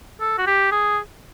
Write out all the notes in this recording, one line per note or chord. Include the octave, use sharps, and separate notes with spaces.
A4
F#4
G4
G#4